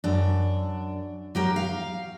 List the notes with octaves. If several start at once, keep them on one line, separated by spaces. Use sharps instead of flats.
F#2 D4
F#3 G4 A#4
F5